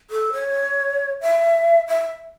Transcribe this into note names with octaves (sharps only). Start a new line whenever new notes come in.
A4
C#5
E5
E5